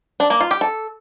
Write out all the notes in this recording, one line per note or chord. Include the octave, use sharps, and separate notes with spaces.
D4
A#3
F4
G4
A4